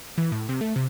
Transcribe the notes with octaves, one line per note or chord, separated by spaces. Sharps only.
E3
A2
C3
A3
C3